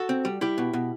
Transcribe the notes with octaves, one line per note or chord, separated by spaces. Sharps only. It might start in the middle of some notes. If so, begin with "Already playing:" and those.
Already playing: F#4 A4
C4
G3
G3 E4 G4
B2
B2